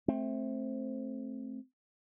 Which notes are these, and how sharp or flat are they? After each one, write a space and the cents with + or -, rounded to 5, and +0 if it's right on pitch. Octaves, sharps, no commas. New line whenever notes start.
A3 -5 C4 +15